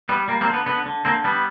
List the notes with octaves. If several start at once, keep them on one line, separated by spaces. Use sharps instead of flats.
G3 B3
G3 A#3
A#3 C4
D3
B3
D3 B3
D3
D3 A#3 C4
G3 B3